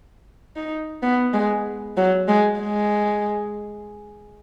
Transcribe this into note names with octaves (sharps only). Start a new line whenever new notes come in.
D#4
B3
G#3
F#3
G#3
G#3